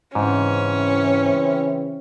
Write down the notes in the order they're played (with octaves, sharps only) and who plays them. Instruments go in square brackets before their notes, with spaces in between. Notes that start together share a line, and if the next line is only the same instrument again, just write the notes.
[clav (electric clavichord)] G#2 [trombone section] C#3 E3 C4 [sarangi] C#4